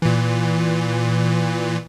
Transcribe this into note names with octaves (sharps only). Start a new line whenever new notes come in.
A#2 E3